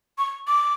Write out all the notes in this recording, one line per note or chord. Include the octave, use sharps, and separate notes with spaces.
C#6
D6